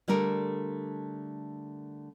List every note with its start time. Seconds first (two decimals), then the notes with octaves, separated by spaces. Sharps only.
0.08 D3 G3 A3 A#4